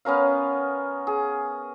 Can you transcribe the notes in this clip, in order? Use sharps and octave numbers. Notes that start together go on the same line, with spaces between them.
B3 C#4 A#4 F5
G#4